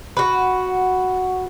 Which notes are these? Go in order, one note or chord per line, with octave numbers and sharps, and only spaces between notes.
F#4 B4